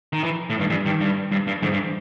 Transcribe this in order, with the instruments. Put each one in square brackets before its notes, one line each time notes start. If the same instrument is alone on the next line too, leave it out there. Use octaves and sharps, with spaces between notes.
[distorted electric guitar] D#3
E3
A2
[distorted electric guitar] G2 [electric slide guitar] D#3
[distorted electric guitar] G2 [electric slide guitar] D3 E3
[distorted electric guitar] G2 [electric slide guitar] D#3
[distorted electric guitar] G2
G2
G2
[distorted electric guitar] G#2 [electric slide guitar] D3 E3
[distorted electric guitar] G2